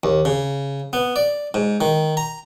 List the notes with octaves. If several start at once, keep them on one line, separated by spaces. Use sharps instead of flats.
D#2
C#3
B3
D5
G#2
D#3
A#5